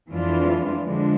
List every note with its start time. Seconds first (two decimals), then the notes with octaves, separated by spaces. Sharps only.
0.11 F2 E3 G#3 D4 F4
0.86 D3 F3 G#3 D4